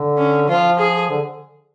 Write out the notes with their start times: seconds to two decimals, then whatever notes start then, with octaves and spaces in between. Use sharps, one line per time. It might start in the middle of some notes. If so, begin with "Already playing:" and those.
Already playing: D3
0.18 C#4
0.48 F3 F4
0.79 G#4
1.10 D3